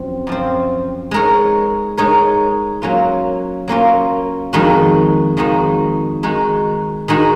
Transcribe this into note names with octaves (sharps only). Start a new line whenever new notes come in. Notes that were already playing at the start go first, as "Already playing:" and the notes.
Already playing: F#2 F3 C4
F#2 F3 C4
G#3 D#4 A#4 C#5
G#3 D#4 A#4 C#5
F#3 A#3 C#4 F4
F#3 A#3 C#4 F4
F2 D#3 G#3 D#4 F#4
F2 D#3 G#3 D#4 F#4
D#3 G#3 D#4 F#4
D#3 G#3 D#4 F#4